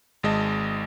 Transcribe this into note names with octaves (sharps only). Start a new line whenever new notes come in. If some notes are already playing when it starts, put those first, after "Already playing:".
G#1 G#3 D#5 A5